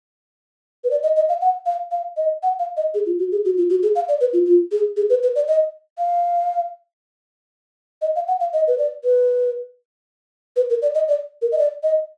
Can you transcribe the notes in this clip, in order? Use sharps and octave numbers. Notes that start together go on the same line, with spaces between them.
B4
D5
D#5
D#5
F5
F#5
F5
F5
D#5
F#5
F5
D#5
G#4
F4
F#4
G#4
F#4
F4
F#4
G#4
F5
D5
B4
F4
F4
G#4
G#4
B4
B4
D5
D#5
F5
D#5
F5
F#5
F5
D#5
B4
D5
B4
B4
A#4
D5
D#5
D5
A#4
D#5
D5
D#5